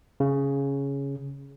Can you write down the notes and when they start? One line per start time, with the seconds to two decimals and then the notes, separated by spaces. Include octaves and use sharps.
0.20 C#3